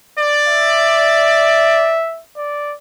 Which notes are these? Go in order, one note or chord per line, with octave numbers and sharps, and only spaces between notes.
D5
E5
D5